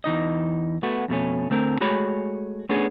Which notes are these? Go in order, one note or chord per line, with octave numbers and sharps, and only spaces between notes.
E2 E3 D#4 D#5
A3 B3 F#4
F2 B2 A3 C#4
D2 A3 C4 A#4
G#3 A3 F#4 G#4 C#5 B5
A3 B3 C#4 D4 G#4